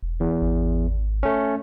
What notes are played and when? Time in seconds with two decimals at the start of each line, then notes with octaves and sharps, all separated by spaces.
0.02 E1
0.20 E2
0.42 G#1
1.23 A3 C#4